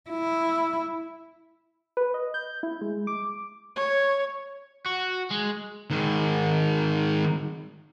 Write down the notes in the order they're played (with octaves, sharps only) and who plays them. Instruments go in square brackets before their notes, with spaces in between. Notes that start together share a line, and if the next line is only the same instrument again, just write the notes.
[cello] E4
[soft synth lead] B4
D#5
G6
E4
G#3
D6
[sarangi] C#5
[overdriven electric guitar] F#4
G#3
[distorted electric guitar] G#2 D#3